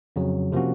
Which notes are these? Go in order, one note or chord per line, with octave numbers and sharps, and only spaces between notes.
F2 C#3 F#3
C3 F3 A#3 C#4 F#4